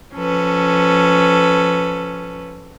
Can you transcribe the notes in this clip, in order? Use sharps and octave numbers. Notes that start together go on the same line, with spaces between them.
F3 C#4 A4 B4